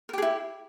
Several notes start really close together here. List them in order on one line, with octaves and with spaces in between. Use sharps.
A#4 G4 G#4 E4